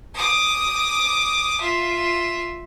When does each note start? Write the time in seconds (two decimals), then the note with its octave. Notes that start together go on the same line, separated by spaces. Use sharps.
0.15 D6 D#6
1.61 F4 E5